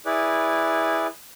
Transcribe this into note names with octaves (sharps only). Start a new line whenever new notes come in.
E4 G#4 B4 D5